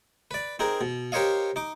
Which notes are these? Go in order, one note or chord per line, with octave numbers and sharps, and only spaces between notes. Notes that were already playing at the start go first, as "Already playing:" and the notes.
B4 D5
C4 D#4 G#4 A#4
B2
G4 A#4 C5 C#5 D#5 F5
D#4 D6